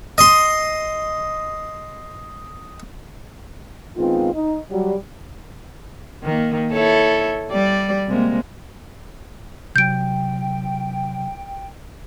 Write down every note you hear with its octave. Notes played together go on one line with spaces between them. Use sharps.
D#5 C6
D#3 G#3 B3 C4 F4
D#4
F#3 G3
D#3 A#3
E4 A4 C#5
G3 D5
C3 G#3 A#3
C3 F#3 G5 G6 D7